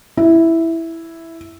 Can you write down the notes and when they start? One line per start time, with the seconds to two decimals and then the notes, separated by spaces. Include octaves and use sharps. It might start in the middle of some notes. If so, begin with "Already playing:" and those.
0.17 E4